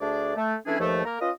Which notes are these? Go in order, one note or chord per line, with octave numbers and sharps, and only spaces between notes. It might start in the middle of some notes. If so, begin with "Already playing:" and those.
D2 A3 D4 G#4 D5
A3
E3 A3 C#4 D4 E4 G#4
D#2 F3 A3
A#3 A#4
C#4 F4 B4 D#5